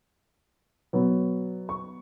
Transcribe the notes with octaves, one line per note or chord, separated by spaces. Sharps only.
B2 F#3 B3
C#6